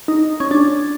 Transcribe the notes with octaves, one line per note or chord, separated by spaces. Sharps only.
D#4
C#4
D4